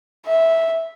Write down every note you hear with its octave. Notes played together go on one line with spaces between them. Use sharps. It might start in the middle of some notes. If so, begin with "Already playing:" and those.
E5